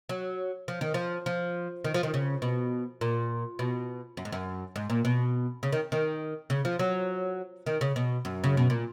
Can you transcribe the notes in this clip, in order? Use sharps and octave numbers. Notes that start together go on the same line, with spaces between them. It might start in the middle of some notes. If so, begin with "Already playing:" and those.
F#3
F3
D#3
F3
F3
D#3
F3
D#3
C#3
B2
A#2
B2
F#2
G#2
F#2
G#2
A#2
B2
C#3
D#3
D#3
C#3
F3
F#3
D#3
C#3
B2
F#2
C#3
B2
A#2